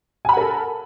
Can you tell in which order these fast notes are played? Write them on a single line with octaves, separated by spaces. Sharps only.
G#5 B5 F#5 A#4 A4